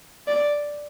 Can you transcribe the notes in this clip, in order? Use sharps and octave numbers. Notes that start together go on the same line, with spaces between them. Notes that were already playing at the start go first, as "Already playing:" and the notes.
D5